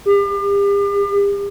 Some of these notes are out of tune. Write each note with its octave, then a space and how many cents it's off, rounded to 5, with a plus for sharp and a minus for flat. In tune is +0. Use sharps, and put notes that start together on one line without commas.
G4 +40